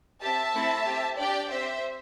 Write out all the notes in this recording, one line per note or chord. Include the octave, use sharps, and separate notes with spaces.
C4 G4 E5 A5
A3 C4 E4 A4
C4 G4
D4 G4 D5 G5
C4 G4 C5 E5